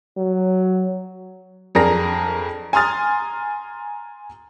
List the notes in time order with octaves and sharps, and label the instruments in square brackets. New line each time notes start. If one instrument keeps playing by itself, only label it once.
[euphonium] F#3
[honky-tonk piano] F2 D4 G#4 A#4 A#5 A#6
G#5 A#5 C6 D#6 F6 A6